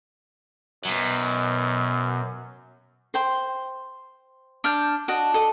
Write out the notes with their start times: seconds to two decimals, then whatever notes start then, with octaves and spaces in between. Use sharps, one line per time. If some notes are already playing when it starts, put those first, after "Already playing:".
0.85 F#2 B2 F#3
3.14 C5 G5 C6
4.64 D4 F6 G6
5.08 D4 F#4 D#5
5.34 A4 D#5